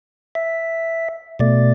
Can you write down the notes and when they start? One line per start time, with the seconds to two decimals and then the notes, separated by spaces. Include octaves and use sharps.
0.35 E5
1.39 B2 A3 D5